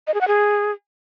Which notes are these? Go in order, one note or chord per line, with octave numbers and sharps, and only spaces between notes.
D#5
G#4
F#5
G#4